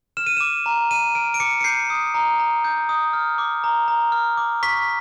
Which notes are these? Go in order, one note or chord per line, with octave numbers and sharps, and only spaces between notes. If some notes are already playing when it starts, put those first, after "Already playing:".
F6 E7
D#7
D6 E7
A#5
A#5 D#7
F6 D7
D7
D6 C#7
C#7
G6 C7
D#6
A#5
A#5
G6
D#6
F6
D6
A#5
A#5
F6
D6
C#6 B6